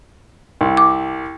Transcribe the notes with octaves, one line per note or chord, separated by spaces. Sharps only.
C2
D6